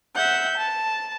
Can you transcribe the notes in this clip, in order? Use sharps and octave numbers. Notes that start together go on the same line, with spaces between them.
E5 F#5 G6
A5